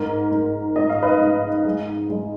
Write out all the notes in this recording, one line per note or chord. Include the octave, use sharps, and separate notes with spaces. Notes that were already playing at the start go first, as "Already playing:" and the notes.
Already playing: G#2 A#4
G#2
G#2 D#5
F5
B4 D#5
G#2
G#3
G#3